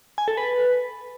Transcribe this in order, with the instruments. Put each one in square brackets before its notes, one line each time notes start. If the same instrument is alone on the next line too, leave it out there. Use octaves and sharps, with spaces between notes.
[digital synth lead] G#5
A4
B4